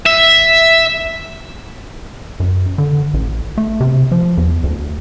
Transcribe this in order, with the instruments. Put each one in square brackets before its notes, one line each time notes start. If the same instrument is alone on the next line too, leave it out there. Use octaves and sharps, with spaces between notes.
[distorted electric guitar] E5
[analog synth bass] F#2
D3
A1
A3
C3
F3
E2
D2